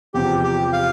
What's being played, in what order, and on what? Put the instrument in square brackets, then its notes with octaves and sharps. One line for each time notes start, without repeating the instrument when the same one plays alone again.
[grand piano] E2 C3 F3 [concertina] G4
[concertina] G4
F5